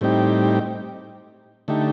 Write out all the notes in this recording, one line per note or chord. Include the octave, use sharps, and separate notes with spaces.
A2 G3 C4 D#4 G4
D3 A3 D#4 G4